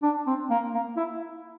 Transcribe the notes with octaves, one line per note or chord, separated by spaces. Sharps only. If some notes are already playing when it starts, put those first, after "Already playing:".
D4
C4
A#3
A#3
E4